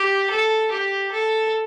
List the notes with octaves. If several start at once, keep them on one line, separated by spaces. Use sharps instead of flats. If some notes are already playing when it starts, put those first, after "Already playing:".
Already playing: G4
A4
G4
A4